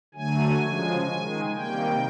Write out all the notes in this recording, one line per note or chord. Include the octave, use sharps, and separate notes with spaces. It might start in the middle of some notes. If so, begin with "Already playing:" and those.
D3 F#3 A3 G#5
C#3 F3 G#3
D#3 G#3
C3 D#3 G3 A#3 G5